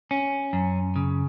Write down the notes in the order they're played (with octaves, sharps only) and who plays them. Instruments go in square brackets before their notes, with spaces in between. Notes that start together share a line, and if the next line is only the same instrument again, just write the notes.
[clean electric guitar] C#4
F#2
C#3